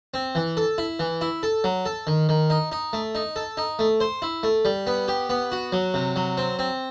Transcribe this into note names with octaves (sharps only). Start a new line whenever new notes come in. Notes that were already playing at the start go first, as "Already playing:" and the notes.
C4
E3
A4
E4
E3
E4
A4
F#3
A4
D#3
D#3
D#4
D#4
A3
D#4
A4
D#4
A3
C5
E4
A3
G3
B3
G4
B3
F#4
F#3
C3
F#3
C4
C4